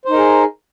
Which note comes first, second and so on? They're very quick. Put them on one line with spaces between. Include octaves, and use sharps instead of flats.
C5 D#4 A#4 G#4